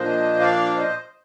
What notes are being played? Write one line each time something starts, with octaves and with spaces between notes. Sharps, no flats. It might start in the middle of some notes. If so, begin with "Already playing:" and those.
Already playing: A#2 F3 A#3 D4 C5 D#5
D5 F5
C5 D#5